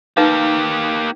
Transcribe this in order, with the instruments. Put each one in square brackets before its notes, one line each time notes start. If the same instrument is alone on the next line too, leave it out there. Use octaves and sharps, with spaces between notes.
[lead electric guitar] A#3 G4 [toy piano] D#4 B4 F5